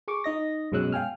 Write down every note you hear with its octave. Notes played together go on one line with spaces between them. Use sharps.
G#4 C#6 D6
D#4 D#5 A#6
F#2 B2 G#3 C#4 E6 F#6
F5 G5 G#5 F6